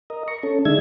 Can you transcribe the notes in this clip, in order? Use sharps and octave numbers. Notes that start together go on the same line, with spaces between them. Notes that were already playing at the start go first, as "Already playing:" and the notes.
A#4 D#5
A#5 C#6
C#4 A4
D3 G#3 D4 D#4 E5 G#6